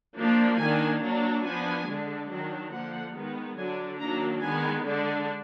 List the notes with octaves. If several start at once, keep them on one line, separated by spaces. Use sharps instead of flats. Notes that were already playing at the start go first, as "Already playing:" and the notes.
F3 A#3 D4
D#3 A#3 D4 G#5
F#3 A#3 D4
F3 B3 D4 G#5
D3 G#3 D4
D#3 F#3 D4
D3 F3 A#3 F#5
D#3 G#3 B3
D3 F#3 D4 G#5
D#3 F#3 A#3 D4 A#5
D#3 G#3 B3 G#5
D3 G#3 D4